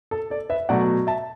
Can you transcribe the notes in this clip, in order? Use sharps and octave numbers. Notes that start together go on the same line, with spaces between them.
A4
A4 D5
B4 E5
B2 F#3 A3 D5 F#5
E5 A5